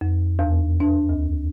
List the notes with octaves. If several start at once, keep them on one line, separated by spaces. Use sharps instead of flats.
F2
E2
D4
D2